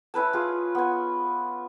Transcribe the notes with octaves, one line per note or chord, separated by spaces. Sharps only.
C#4 E4 B4 A5
F4 G#4
B3 G#5